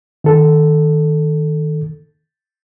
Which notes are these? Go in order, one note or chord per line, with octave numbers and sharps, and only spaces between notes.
D#3 A4